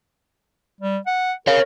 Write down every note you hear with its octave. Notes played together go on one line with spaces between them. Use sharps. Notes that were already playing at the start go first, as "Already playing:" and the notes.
G3
F#5
A#4 C#5 F5